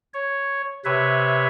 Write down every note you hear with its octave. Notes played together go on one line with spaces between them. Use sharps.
C#5
C3 B4 C#5 E5